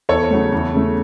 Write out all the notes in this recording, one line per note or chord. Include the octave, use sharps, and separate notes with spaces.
E2 A4 C#5
C#3 F#3 A3
E2
C#3 A3